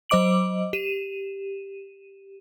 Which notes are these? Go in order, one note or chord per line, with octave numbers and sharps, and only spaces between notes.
F#3 C5 D#5 D6 D7 F#7
G4 D#7 E7